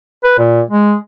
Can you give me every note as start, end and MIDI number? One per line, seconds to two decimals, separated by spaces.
0.24 0.33 71
0.38 0.61 46
0.71 0.95 56